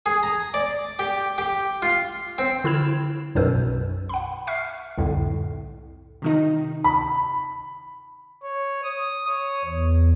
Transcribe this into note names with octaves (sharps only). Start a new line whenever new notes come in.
G#4
A#5
D5
G4
G4
F4
C4
D3 E4 F6 G#6 E7
B1 F#2 B2 B4 C5 E6
F#5 B5
E5 F#5 C#6 F6 C7
C2 F2 A2 D3
C3 D#3 D#4
B5
C#5
D#6
C#5
E2